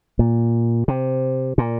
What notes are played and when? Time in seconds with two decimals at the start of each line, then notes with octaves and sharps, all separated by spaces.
0.19 A#2
0.88 C3
1.58 A#2